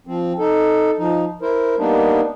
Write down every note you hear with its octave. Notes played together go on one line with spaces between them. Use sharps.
F3 C4
D#4 A4
F3 D#4
E4 A#4 C5
G3 A#3 B3 D4 D#4